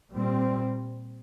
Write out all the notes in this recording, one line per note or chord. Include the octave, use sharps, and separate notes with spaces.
A#2 G3 C4